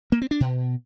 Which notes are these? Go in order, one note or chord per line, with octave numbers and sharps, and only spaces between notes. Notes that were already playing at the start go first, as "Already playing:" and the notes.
A#3
C4
D4
B2